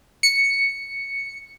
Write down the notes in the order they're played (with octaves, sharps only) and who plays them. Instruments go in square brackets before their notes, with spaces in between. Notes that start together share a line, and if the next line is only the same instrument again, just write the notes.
[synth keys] C#7